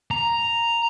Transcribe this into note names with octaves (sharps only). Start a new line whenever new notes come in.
A#5